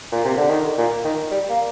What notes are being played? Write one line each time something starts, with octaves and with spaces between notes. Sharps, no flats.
A#2
C3
D3
D#3
A#2
D#3
G3
A#3